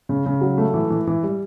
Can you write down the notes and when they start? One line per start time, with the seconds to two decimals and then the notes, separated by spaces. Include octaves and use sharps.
0.09 C#3
0.26 C#3
0.41 F#3
0.58 A3
0.74 E3
0.90 E3
1.07 E3
1.23 G3